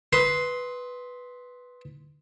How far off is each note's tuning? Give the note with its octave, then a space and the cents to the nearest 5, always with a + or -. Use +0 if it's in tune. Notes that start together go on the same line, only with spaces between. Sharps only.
B4 +0 C6 +0 D#6 +35